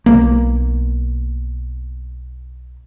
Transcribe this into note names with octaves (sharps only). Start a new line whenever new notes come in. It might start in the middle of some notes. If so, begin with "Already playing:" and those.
B1 A#3